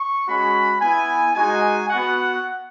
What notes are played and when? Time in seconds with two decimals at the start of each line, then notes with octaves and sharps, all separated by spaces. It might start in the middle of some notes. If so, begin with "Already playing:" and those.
Already playing: C#6
0.28 G#3 C#4 F#4 B5
0.81 B3 E4 G#5
1.35 G#3 D#4 F#4 G#5
1.89 B3 F#4 F#5